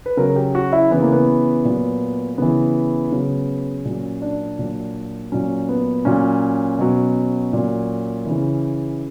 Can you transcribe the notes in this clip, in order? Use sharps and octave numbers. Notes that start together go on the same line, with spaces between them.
B4
C#3 F#3 A#4
G4
F#4
E4
C#3 E3 B3
A#3
B3
A#2 F#3
C#3 E3 B3
C#3 F#3
A#2 F#3 C#4
D4
A#2 F#3
A#2 F#3 C#4
B3
A#2 F#3 C#4
B2 F#3
A#2 F#3
C#3 E3